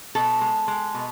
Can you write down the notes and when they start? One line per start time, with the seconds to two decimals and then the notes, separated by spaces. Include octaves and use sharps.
0.15 B2 A4
0.41 G#3
0.68 G#3
0.94 B2